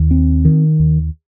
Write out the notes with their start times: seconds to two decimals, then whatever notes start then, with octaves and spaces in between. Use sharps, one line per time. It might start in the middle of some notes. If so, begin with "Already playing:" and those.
Already playing: D#2
0.11 C4
0.45 D#3
0.80 D#2